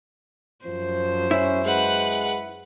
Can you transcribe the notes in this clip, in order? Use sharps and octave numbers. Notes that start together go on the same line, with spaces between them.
F#2 F3 C5
C#4 E4
G#3 B4 F#5